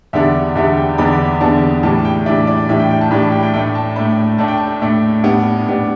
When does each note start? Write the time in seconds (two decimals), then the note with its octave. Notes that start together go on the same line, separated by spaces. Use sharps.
0.13 E2 D3 G3 B3 D4 E5
0.55 E2 D3 G3 B3 D4 E5
0.77 G5
0.98 E2 D3 G3 B3 D4 B5
1.41 E2 D3 G3 B3 D4 A5
1.83 A2 E3 G3 D4 A5
2.05 G5
2.26 A2 E3 G3 D4 E5
2.47 D5
2.69 A2 E3 G3 D4 E5
2.79 G5
2.90 G5
3.01 A5
3.11 A2 E3 G3 D4 B5
3.22 A5
3.32 G5
3.43 G5
3.54 A2 A3 D4 G5
3.75 A5
3.96 A2 A3 D4 B5
4.38 A2 A3 D4 A5
4.48 G5
4.57 A5
4.82 A2 A3 D4
5.24 A2 G3 B3 D4
5.67 A2 G3 B3 D4